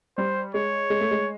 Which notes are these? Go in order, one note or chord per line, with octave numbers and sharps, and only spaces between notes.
G3 C5
G#3 C#5
G#3
A3
G#3